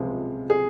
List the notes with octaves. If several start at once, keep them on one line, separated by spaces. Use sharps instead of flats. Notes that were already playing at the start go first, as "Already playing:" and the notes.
Already playing: C#2 C3 F3 G#3
G#4